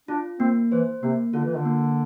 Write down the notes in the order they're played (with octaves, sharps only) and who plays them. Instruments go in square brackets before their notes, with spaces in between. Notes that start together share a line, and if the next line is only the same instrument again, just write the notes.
[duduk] D4 [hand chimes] F4
[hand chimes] A#3 [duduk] C4
[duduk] E3 [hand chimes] C5
[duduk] C3 [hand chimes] A#3
[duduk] D3 [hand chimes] F4
[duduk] E3
D3
[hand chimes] A#3